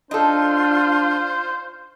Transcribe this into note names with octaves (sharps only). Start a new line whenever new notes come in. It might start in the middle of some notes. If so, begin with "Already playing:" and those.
D4 D#4 F4 A4 C5 C6